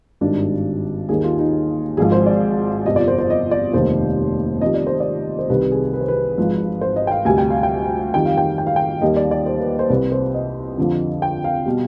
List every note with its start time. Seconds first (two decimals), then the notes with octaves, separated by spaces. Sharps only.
0.21 G#1 G2 D#3 G3 D4
1.09 D#2 D#3 G3 G#4
1.24 F4
1.39 D#4
1.97 G#1 G#2 F3 G#4
2.12 C5
2.26 D5
2.85 G1 F2 C3 D#5
2.96 D5
3.08 C5
3.18 C5
3.30 D#5
3.51 D5
3.74 F1 D#2 D#3 G3 C5
4.61 F2 D#3 G3 D#5
4.74 D5
4.87 C5
5.00 D5
5.39 C5
5.50 C2 C3 D#3 G3 B4
5.72 G#4
5.94 B4
6.01 C5
6.08 B4
6.38 G#1 G#2 F3
6.81 C5
6.96 D#5
7.07 G5
7.11 F5
7.25 D2 C3 G3 G#5
7.38 G5
7.50 F5
7.63 G5
8.14 F2 D#3 G3 G5
8.25 F5
8.37 G5
8.58 G5
8.67 F5
8.76 G5
9.01 D#2 D#3 G3 D#5
9.16 D5
9.31 D5
9.46 C5
9.60 B4
9.79 C5
9.89 C2 C3 G3 B4
10.12 C5
10.34 D#5
10.78 F2 D3 F3
11.22 G5
11.44 F5
11.66 B2 G3